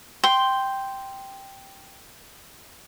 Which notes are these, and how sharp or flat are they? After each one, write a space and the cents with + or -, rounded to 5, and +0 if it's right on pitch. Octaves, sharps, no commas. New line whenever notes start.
G5 +0 C6 +0